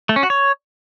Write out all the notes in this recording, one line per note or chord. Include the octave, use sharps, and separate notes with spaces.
A3
C#4
F#4
C#5